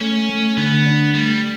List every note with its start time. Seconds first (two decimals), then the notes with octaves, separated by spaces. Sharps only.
0.01 A3 C#4
0.29 A3
0.57 D3 B3
0.86 D4
1.14 G3 A3